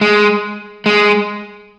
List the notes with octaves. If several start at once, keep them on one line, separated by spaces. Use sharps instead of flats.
G#3
G#3